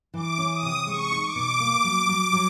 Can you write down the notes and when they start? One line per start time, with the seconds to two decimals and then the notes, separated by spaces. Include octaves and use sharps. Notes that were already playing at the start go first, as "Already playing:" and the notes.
0.14 E3 D6
0.38 C#4
0.51 D#6
0.62 C3
0.87 G#3 C#6
1.12 D#4
1.23 D6
1.35 B2
1.60 A#3
1.84 F#3
2.09 F#3
2.33 F#3